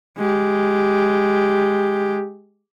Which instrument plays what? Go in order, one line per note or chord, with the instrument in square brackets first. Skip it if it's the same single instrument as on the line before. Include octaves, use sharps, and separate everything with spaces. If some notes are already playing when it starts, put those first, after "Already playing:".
[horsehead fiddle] G#3 G4